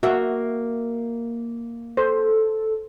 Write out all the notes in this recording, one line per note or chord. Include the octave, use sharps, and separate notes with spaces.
A#3 F#4 E5
A4 C5